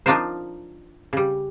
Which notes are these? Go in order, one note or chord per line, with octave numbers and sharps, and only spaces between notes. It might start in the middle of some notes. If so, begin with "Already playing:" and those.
F3 D4 D#4 F4 A#4 C5
C#3 G3